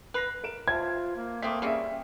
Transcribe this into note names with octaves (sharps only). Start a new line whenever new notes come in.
B4 A#6 C7 F7
A#4 D7 E7
F4 C5 E5 A5 G#6
A#3
A3 A#3 C4 D6 D#6 B6
G3 C4 C#4 G#4 E5